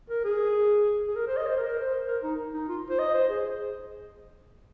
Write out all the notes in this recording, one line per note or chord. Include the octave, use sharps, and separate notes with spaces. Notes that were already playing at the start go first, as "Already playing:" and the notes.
A#4
G#4
G#4
A#4
C5
D#5
C5
A#4
A#4
C5
A#4
D#4
D#4
F4
C5
D#5
C5
G#4